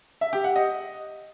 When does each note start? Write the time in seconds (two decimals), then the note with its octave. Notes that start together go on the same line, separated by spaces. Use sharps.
0.21 E5
0.33 G4
0.44 F#5
0.56 D#5